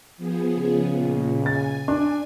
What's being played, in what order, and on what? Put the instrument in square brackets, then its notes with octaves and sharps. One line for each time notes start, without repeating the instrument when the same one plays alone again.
[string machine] F3 B3 G#4
[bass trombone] C#3
[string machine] A#2
[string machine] G#5 [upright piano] A6
[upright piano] D4